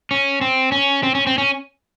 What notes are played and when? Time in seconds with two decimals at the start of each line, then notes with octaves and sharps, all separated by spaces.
0.11 C#4
0.41 C4
0.72 C#4
1.03 C4
1.15 C#4
1.27 C4
1.38 C#4